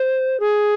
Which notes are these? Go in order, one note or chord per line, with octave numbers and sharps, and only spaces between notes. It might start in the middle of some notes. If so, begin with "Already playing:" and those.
Already playing: C5
G#4